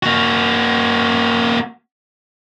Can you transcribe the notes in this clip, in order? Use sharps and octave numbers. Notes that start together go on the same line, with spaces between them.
A#3 F#4